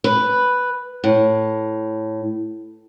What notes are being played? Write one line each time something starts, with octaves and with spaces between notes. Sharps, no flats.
B4
A2